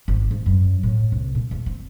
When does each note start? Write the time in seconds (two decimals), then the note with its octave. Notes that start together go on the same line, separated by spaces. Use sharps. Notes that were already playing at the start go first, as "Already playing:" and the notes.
0.08 G#1
0.31 G#2
0.46 F#2
0.83 A2
1.12 C2
1.35 A#2
1.51 E2
1.66 C4